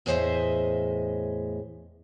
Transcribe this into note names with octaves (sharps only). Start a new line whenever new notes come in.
E2 A2 G#4 C5 D#5 E5